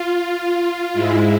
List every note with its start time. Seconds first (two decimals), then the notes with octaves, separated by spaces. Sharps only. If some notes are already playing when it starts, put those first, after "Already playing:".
Already playing: F4
0.94 G#2 G#3 E4